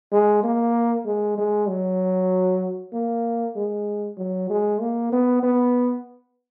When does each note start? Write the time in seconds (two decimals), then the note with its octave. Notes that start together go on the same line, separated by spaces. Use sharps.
0.12 G#3
0.43 A#3
1.06 G#3
1.38 G#3
1.68 F#3
2.93 A#3
3.56 G#3
4.17 F#3
4.49 G#3
4.81 A#3
5.12 B3
5.43 B3